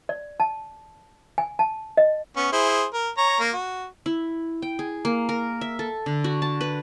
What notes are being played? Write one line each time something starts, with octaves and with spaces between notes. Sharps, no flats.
D5
A5
G#5
A5
D#5
B3 C#4
E4 G#4 C5
A#4
C#5 A#5
A#3
F#4
E4
G5
G#4
A#3
A#4
E5
A4
D3
F#4
A5
B4